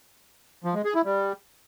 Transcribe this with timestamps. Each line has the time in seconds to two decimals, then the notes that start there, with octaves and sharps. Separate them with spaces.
0.64 F3
0.74 G#3
0.85 G#4
0.95 E4
1.05 G3